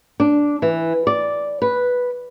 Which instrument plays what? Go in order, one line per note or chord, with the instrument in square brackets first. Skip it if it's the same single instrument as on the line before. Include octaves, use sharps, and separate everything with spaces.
[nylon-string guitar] D4
E3
D5
B4